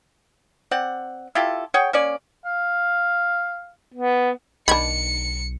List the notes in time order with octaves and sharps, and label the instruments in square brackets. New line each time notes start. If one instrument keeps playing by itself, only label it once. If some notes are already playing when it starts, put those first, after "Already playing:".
[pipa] C4 D5 F#5
E4 F4 G4 A4
G#4 C#5 F#5 G5
A#3 C#4 D5
[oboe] F5
[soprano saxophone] B3
[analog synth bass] B1 [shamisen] D#3 D4 [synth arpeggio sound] B5 G#6 [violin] C#7